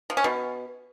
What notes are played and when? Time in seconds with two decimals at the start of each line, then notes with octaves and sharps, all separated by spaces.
0.10 F3
0.17 C#4
0.24 B2